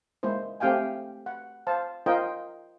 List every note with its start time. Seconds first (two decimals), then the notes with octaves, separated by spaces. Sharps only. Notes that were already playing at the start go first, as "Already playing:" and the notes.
0.23 G#3 A#3 E4 C5
0.60 A3 C4 G4 F5 G5 G#5
1.26 F#5
1.67 C5 F5 A5
2.06 F4 A#4 C5 D#5 G5